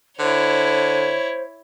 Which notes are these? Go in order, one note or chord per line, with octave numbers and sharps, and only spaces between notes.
D3 E4 C5 C#5